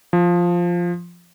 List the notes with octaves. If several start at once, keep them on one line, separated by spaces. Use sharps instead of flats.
F3